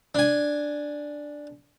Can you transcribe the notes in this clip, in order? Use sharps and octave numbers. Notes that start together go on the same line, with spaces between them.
D4 G#5